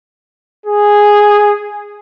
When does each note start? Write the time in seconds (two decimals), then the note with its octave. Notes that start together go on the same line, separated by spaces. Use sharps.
0.66 G#4